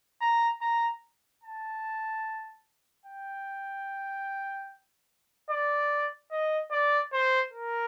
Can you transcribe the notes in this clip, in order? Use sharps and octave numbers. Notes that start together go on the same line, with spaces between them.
A#5
A#5
A5
G5
D5
D#5
D5
C5
A#4